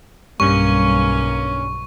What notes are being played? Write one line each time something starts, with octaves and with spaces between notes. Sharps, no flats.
B1 G2 G3 A#3 C#4 C#6